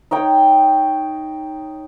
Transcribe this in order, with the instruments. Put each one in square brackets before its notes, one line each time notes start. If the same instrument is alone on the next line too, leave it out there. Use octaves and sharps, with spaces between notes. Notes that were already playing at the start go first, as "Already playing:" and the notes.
[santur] D#4 C#5 G5